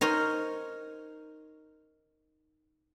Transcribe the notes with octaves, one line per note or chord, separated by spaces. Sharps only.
D#4 A#4 C5 C#5